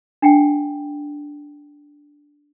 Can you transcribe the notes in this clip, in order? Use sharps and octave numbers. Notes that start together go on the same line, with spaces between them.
D4 F#5 G5